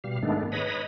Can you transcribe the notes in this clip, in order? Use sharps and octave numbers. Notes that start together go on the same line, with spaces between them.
B2 G3 F5
G#2 D#3 G#3 A3 B3 D4
B4 C#5 D#5 A#5 B5 D#6